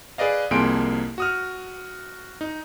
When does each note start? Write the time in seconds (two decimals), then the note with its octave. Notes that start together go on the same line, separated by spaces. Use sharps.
0.18 G#4 B4 D5 D#5 F5
0.51 C2 F2 A#3 G#4 C6 D7
1.18 F#4 D#6 F6
2.41 D#4